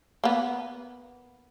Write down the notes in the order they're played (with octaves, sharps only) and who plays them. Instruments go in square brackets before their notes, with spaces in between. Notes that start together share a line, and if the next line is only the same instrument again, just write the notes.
[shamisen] A#3 B3